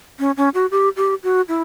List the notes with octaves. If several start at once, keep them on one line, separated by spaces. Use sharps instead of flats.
C#4
C#4
F#4
G4
G4
F#4
E4